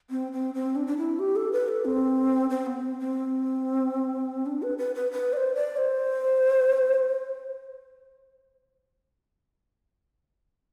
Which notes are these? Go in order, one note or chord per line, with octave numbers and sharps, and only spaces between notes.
C4
C4
C4
D4
D4
E4
G4
A4
B4
A4
C4
C4
B3
C4
C4
D4
B4
B4
B4
B4
D5
C5
D5
C5